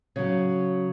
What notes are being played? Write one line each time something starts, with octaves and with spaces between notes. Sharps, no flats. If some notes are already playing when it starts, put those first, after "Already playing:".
C#3 F#3